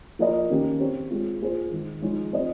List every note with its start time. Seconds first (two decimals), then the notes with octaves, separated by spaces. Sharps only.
0.19 F3 A#3 F4 A#4 D#5
0.50 D#3 A#3 C#4 G4
0.80 C4 G4 C#5
1.11 G#3 C4 F4
1.41 A#3 F4 G#4 C5
1.71 D#3 G#3 D#4
2.02 F3 G#3 D#4 G#4 C#5
2.33 C4 F4 C5 D#5